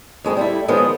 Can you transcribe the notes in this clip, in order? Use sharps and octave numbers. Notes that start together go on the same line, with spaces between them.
F2 G#3 C4
G3 A3 E4
D#3 F3 G#3 B3 C#4